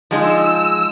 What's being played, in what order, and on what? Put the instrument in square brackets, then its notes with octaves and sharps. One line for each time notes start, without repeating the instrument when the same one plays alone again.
[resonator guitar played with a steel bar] F3 G#3 D#4 [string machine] E6